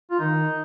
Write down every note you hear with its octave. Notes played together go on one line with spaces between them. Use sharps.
F4
D#3 D#4